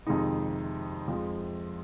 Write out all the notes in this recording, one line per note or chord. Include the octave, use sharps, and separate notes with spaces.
F2 C3 D#3 G#3 D#4
F2 F3 G#3